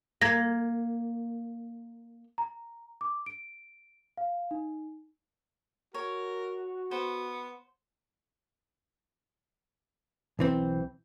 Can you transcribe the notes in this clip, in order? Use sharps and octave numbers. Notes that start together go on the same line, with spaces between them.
A#3 G#6 A#6
A#5
D6
D7
F5
D#4
F#4 A#4 C#5
B3 C5
B1 E3 C4